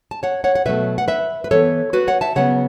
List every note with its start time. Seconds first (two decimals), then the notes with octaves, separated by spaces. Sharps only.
0.11 A5
0.23 C#5 F#5
0.44 C#5 F#5
0.55 F#5
0.66 B2 F#3 A3 B4 E5
0.98 F#5
1.08 B4 E5
1.44 B4
1.51 E3 B3 A4 C#5
1.93 F#4 B4
2.08 C#5 F#5
2.21 E5 A5
2.36 C#3 F#3 B3 C#5 F#5